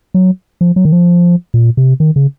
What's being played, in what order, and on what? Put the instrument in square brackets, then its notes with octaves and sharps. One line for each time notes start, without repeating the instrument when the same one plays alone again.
[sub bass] F#3
F3
F#3
D#3
F3
A#2
C3
D#3
C#3